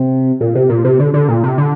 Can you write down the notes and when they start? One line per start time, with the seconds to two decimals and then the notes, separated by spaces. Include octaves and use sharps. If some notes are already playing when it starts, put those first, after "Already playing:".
Already playing: C3
0.41 A#2
0.55 C3
0.70 A#2
0.85 C3
0.99 D3
1.14 D3
1.29 A#2
1.44 C3
1.58 D3